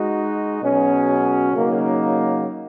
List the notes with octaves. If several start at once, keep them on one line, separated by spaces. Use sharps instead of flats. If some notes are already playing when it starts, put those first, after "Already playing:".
Already playing: G#3 D#4 F#4
B2 F#3 C#4 G#4
C#3 F#3 A#3 D#4